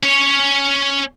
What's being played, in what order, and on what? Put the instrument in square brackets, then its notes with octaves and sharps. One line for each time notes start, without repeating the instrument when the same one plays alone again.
[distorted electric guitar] C#4 C#5